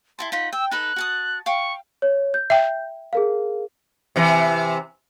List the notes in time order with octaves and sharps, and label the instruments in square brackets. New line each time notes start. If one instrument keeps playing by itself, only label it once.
[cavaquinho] E4 F#4 A5 [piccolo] C6
[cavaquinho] D#4 F4 F#5 [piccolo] B6
[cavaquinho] G5 [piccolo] E6
[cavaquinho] D#4 A4 B4 [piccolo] F#6
[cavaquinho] F#4 A5 D#6
[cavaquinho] F5 G5 [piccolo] C#6
[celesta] C#5
G6
[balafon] E5 G5
[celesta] G#4 A#4 F5
[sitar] C3 E3